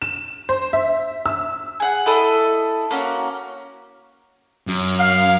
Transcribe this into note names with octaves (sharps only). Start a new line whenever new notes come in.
E7
C5
E5
E6
G#4 F#5
E4 A4 D#5
A#3 C#4 F#4
F#2
F5